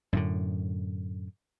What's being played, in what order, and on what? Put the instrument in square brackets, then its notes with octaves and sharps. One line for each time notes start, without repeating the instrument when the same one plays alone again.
[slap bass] F#2 A2 D3